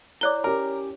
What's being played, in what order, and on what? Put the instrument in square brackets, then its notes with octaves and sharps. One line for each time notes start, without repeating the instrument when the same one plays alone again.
[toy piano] E4 C#5 D6 [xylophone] D5 F#6 G7
[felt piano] C#4 G4 [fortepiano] A#4